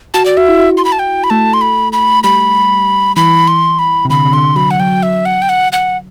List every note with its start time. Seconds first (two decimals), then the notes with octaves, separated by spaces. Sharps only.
0.14 F#4 A5
0.26 D5
0.37 F#4 E5
0.48 E4
0.60 F#4
0.78 C6
0.85 B5
0.92 A5
0.99 G5
1.24 B5
1.30 A3 A5
1.54 C6
1.61 B5
1.93 B5
2.24 G3 B5
3.16 E3 B5
3.48 C6
3.79 B5
4.05 C3
4.10 D3 B5
4.25 C3
4.33 D3 C6
4.56 F#3 B5
4.71 F#5
4.80 F#3 G5
5.03 E5
5.26 F#5
5.42 G5
5.49 F#5
5.72 F#5